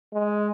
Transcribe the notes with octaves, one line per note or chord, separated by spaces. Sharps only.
G#3